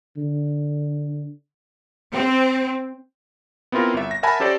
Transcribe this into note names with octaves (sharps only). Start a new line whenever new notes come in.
D3
C4
B3 C4 E4 F4 A#4
G1 E5
A#6
A#4 E5 F#5 G#5 A5 B5
C#4 G4 A4 C5 D5